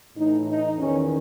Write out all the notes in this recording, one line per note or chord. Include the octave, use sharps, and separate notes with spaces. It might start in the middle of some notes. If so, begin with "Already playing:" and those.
A2 E3 D#4
D#4
E2 D#3 C#4